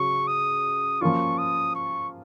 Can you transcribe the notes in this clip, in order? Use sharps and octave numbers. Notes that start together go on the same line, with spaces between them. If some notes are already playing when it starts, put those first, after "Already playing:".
Already playing: C#3 F#3 C#6
D#6
F3 A#3 C#4 F4 C#6
D#6
C#6